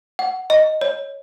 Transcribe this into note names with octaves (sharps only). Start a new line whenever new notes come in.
F#5
D#5
C#5